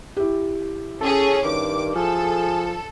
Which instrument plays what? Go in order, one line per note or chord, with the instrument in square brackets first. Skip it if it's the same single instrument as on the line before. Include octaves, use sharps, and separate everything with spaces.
[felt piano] E4 G4
[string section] C#4 G#4 [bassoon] A4
[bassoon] G2 [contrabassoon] D#3 [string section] D6
[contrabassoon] F3 [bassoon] G#4 [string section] A4